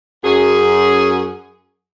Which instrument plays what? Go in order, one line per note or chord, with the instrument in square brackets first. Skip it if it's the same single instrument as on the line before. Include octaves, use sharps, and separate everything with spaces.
[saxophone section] F#2 G#4